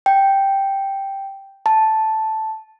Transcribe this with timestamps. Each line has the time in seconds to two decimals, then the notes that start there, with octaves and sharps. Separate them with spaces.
0.06 G5
1.66 A5